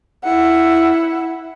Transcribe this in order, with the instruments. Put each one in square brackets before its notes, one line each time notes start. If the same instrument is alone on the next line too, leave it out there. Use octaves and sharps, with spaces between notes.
[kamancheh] E4 F#5